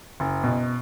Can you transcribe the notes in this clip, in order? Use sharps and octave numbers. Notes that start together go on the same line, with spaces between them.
F#1
B2